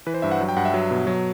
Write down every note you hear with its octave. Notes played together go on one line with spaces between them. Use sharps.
E3 B4
C5
G2 E5
F#5
F#3
G5
G2 F#5
E5
F#3
B2
F#3